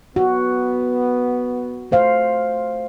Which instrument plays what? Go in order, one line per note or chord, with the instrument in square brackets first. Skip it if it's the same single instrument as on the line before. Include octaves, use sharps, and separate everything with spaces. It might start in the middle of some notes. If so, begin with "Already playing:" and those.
[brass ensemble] B3 [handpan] F#4
[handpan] A3 C5 F5